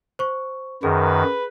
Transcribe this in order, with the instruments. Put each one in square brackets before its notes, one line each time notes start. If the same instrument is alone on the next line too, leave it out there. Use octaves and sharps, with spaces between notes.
[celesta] C5 C#6
[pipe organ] F#2 D#3 [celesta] G#4 [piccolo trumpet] B4